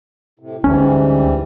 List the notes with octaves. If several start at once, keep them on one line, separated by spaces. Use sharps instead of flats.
A2 C3
D2 G#2 E3 G3 C#4